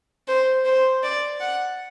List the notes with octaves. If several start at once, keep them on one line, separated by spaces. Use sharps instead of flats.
C5
C5
D5
F#5